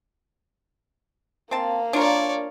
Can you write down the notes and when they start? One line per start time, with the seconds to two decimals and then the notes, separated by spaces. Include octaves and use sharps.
1.51 A#3 C4 F5 A5
1.93 D4 F4 A#4 C#5 D5